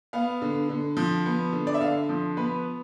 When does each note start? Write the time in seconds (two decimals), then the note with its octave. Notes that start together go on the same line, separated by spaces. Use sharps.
0.13 B3 F5
0.42 D3
0.69 D3
0.97 F3
1.26 B3
1.53 D3
1.67 D5
1.74 E5
1.81 D3 F5
2.09 F3
2.37 B3 B4